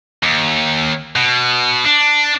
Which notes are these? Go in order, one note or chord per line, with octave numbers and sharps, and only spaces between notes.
D#2
B2
D4